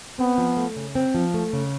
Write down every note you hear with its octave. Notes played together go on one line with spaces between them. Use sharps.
B3 C4
F3
A3
C#3
C4
F3
A3
C#3